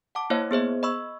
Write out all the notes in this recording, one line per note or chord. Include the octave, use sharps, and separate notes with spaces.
F#5 A5 D6
A#3 E4 C5 C#5 D#5 F5
B3 G#4 C5 D#5
D#5 B5 C#6 E6